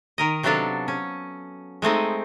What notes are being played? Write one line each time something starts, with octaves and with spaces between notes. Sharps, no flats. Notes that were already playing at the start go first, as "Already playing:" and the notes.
D#3 A#4 D#5
C3 F#3 B3 D4 A4 F5
C#4
G#3 A3 C4 D#4